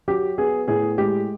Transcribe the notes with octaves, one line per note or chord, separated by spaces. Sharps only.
F#3 G4
B3 G#4
A2 G#4
G#3 G4